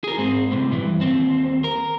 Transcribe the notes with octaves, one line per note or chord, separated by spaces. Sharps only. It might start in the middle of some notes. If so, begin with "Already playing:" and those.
G#4 A#4
G#2 C4
A2 C3
G2 E3
D#2 C4
A#4